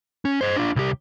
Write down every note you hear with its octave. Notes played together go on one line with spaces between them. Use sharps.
C#4
C5 D#5
D4 F4
C2 G4